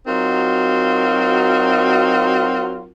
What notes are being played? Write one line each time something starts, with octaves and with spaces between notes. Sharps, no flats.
F#3 C4 D#4 F4 F#4 A#4